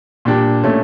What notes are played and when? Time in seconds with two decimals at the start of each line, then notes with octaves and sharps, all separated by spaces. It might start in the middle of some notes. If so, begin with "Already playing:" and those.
0.25 A#2 G3 D4 G4
0.63 A#2 A3 C#4